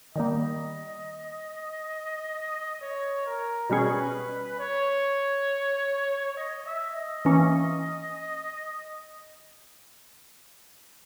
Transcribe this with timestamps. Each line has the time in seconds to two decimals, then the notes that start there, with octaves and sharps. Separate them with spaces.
0.15 D#3 G3 A#3 D#5
2.81 C#5
3.26 A#4
3.70 B2 G3 C#4 G#4 B4
4.59 C#5
6.37 D#5
6.66 E5
6.95 D#5
7.25 E3 A#3 C#4